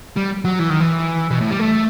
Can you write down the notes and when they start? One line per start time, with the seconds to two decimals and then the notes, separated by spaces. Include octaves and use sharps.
0.16 G3
0.45 F#3
0.59 E3
0.70 D#3
0.80 E3
1.31 B2
1.41 A2
1.51 G3
1.59 A3